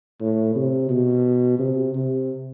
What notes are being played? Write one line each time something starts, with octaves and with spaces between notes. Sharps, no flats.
A2
C3
B2
C3
C3